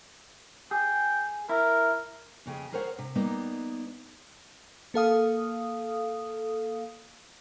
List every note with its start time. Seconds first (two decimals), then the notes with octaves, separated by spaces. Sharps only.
0.71 G#4 G5
1.49 E4 A#4
2.46 F2 C#3 G4 G#4
2.72 G#4 A#4 C5 C#5 F5 F#5
2.99 C3
3.15 G3 A#3 B3 D#4
4.94 A#3 A4 F5 D#6